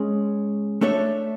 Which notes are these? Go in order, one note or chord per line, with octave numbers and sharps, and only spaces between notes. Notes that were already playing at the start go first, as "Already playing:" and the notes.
Already playing: G#3 C#4 G#4
A3 D4 A4 C#5 E5